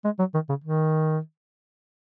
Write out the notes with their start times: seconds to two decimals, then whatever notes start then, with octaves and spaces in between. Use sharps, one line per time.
0.05 G#3
0.19 F#3
0.34 D#3
0.49 C#3
0.65 D#3